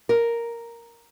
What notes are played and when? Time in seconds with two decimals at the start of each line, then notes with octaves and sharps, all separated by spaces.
0.09 A#4